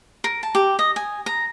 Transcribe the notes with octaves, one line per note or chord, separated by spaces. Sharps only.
A#4
A5
G4
D#5
G#5
A#5